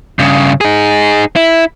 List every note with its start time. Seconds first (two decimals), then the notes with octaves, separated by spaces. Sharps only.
0.19 G2 C#3
0.61 D#4 G#4
1.36 E4